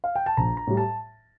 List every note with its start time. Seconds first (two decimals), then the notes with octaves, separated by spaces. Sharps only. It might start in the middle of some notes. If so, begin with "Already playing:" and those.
0.04 F5
0.15 G5
0.26 A5
0.37 A#1 A#5
0.57 A#5
0.67 A2 G3
0.77 A5